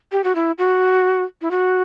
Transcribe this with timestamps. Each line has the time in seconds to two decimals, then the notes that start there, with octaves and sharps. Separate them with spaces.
0.12 G4
0.24 F#4
0.35 E4
0.58 F#4
1.41 E4
1.51 F#4